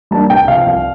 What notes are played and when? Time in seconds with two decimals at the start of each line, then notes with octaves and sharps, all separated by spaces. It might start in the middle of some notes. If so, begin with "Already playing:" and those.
0.11 G3 A#3 D4 A5
0.30 C2 G5
0.48 C3 F3 F5
0.67 C2